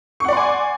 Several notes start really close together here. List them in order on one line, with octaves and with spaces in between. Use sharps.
C#6 F#5 D5 C6 G#5